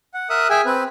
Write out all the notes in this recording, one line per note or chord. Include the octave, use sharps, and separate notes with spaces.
F#5
A#4 E5 D#6 F#6
G#4 E5 G5 G#5
C4 B4